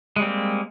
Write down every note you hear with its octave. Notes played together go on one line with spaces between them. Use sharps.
G3 G#3 A#3 C4